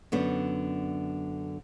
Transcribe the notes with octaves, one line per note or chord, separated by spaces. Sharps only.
F#2 D3 B3